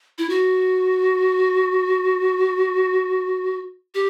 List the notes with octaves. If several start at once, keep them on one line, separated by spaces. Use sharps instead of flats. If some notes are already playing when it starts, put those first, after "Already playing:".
E4
F#4
G4